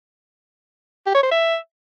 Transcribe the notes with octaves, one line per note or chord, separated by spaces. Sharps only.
G4
C#5
C5
E5